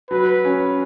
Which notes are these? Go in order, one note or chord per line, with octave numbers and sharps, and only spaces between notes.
F#3 B4
C#4